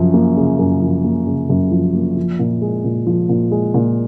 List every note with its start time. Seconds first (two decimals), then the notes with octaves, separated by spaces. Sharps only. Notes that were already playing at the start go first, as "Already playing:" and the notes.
Already playing: F#2 C#3 F3
0.14 A#3
0.37 C#3
0.59 F#2
0.82 F3
1.04 A#3
1.27 C#3
1.50 F#2
1.71 F3
1.94 A#3
2.17 F3
2.39 A#2
2.61 G#3
2.84 A#2
3.06 F3
3.29 A#2
3.51 G#3
3.74 A#2